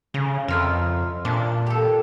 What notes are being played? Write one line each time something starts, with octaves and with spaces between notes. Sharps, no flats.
C#3 A#5
F2 E4 F4 A#4
A#2 D4
G4 A4